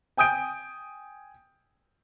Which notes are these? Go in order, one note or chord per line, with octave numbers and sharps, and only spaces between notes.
G5 G#5 D#6 G6 D7